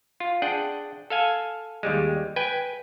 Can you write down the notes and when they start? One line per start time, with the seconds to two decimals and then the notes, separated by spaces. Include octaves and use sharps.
0.20 F4
0.42 D4 G#4 F#5 G5
1.10 A4 F5 G#5
1.83 D#2 G3 G#3
2.36 B4 G5 G#5